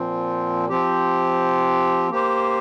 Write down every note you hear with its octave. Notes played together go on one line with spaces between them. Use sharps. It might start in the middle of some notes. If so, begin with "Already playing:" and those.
Already playing: A#2 F3 C4
F3 C4 G4
A#3 G4 C5